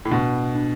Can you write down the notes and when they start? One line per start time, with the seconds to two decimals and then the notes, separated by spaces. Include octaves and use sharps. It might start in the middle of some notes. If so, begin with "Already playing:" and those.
0.05 A2
0.11 B2 D4
0.55 D4